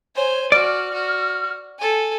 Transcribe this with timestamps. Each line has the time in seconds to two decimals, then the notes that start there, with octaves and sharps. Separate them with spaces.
0.15 C5 C#5 G#5
0.52 F#4 D5 F6
0.93 F#4
1.79 A4 G#5